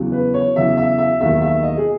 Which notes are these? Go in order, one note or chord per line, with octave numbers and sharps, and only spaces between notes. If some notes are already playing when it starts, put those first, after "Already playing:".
Already playing: E2 C#3 F#3
B4
C#5
E2 C#3 F#3 E5
E5
E5
E1 D#2 D#3 F#3 E5
E5
D#5
G#4